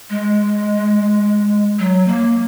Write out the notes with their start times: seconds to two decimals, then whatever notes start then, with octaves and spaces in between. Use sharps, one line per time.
0.10 G#3
1.79 F#3
2.07 A#3